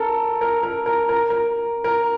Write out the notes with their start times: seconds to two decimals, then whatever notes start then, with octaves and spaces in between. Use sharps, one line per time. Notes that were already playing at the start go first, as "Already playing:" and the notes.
Already playing: A4 A#4
0.41 A#4
0.63 A#4
0.86 A#4
1.09 A#4
1.30 A#4
1.84 A#4